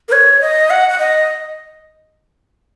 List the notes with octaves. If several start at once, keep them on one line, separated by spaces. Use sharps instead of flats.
A#4
C#5
D#5
F#5
F#5
D#5